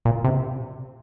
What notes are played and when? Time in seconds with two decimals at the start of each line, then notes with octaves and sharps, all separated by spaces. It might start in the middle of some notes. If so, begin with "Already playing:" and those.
0.05 A#2
0.24 C3